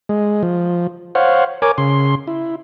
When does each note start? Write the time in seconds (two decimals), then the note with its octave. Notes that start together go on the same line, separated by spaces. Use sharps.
0.09 G#3
0.43 F3
1.15 C5 C#5 F5 F#5
1.62 A#4 C#5 G#5 D6
1.78 C#3 C6
2.27 E4